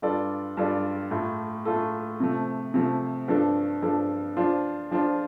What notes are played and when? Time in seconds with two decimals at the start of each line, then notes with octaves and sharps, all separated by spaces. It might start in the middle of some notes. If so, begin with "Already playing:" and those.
0.02 G2 G3 F4 A4 D5
0.57 G2 G3 F4 A4 D5
1.11 A2 A3 F4 A4
1.65 A2 A3 F4 A4
2.20 C3 F3 A3
2.74 C3 F3 A3
3.28 G2 F3 D4 A4
3.82 G2 F3 D4 A4
4.37 F3 D4 F4 C5
4.91 F3 D4 F4 C5